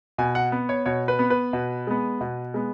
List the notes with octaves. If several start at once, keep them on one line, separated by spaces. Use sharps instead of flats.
B2 G#5
F#5
B3
C#5
B2 C#5
B4
B3
B4
B2
G#3 B3
B2
G#3 B3